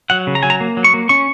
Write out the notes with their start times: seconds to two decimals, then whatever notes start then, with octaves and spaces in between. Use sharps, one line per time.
0.10 F#3 F#5
0.27 C#3
0.35 A#5
0.43 F#3 G#5
0.50 A#5
0.61 A#3
0.77 F#3
0.84 C#6
0.94 A#3
1.09 C#4 C#6